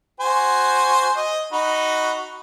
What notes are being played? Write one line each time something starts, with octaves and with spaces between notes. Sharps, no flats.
F#4 C5 G#5
D#5
D#4 F#4 B5